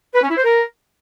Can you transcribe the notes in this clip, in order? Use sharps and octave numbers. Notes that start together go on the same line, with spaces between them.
B4
C#4
E4
C5
A#4